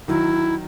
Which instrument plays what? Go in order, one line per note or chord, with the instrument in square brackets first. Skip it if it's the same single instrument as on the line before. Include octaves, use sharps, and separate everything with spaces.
[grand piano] D#3 F#3 [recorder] E4